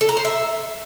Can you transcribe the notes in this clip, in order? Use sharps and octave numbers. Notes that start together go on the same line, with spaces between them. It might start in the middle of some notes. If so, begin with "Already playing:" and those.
A4
A#5
C5
E5